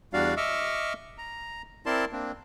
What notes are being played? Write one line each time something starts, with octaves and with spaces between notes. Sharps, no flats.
E2 G3 D4 F#4 D5 F5
D#5 E5 C#6 D6 E6 F6
A#5
C4 E4 A#4 D5 A5 C6
A#3 C4 D4